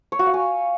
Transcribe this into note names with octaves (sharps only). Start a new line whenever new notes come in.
C#5
F#4
F5
G#5